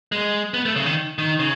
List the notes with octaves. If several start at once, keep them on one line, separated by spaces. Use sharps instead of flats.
G#3
B3
A3
C#3
D#3
D#3
C#3